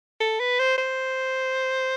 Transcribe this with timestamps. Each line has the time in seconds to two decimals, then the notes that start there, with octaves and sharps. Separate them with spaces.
0.20 A4
0.40 B4
0.59 C5
0.78 C5